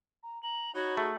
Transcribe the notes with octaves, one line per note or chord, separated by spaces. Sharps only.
A#5
A#5 F#7
D#4 F#4 C#5 B5
A3 G#4